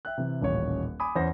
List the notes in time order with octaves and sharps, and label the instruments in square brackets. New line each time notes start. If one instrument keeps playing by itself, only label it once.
[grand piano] E5 G5 F#6
C3 E3
D#1 A1 C#5
G#5 B5 D6 D#6
E2 C#4 C5 A#6